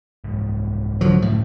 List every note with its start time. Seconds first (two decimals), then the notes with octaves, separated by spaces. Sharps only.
0.24 C2 G#2
1.01 D3 F3 F#3
1.22 F#2 A2 G3 C#4